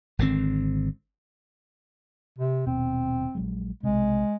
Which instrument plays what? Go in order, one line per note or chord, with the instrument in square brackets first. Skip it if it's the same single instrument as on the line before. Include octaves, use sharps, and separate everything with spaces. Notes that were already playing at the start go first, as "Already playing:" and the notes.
[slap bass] G#1 D3 D#3 C4
[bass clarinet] C3
[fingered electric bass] D#1 B2 [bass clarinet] C4
[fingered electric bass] A#1 F#3 G#3
[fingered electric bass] B1 C3 [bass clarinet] G#3